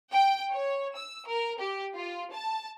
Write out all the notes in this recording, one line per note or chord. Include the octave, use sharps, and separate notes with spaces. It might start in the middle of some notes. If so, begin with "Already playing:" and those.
G5
C#5
E6
A#4
G4
F4
A5